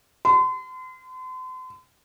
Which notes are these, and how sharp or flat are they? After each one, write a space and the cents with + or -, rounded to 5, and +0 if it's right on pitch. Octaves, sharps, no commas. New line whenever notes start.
C6 -40